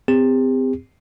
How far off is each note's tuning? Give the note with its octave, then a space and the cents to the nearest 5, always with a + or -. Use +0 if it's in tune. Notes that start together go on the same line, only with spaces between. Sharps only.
C4 -30 G4 +40